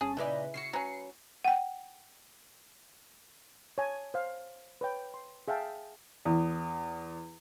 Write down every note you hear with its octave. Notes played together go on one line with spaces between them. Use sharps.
G1 C#4 G#4 A5
A#2 C#3 E3 G#3 D#4 B4 D5 E5
C#3 E4 F#4 C7 C#7
F#3 C#4 B4
F#5 G5
C#5 G#5 A5
C5 F5
B4 C#5 G5
C6
G#4 E5 F5 G5 A5
E2